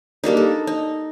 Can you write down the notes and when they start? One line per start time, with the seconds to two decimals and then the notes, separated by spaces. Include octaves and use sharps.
0.24 G3 A#3 D4 D#4
0.37 A4
0.67 D#4